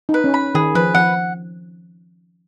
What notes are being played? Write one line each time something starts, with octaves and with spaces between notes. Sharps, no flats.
D#4
B4
C#4
B5
D#3 G#4
F3 B4
F3 F#5